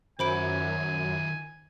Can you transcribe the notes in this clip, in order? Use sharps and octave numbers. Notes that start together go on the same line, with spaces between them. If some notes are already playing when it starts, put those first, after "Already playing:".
F#2 D#3 C5 E5 G#5 B5 D7